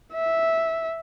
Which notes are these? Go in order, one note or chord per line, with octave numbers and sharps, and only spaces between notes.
E5